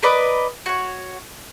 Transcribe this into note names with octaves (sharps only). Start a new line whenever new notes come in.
A#4 B4 D5 D#5
F#4 C#5